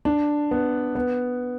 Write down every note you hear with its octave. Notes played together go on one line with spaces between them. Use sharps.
D4
B3
B3